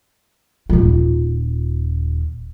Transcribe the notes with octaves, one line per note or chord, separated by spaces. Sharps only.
D#1 F4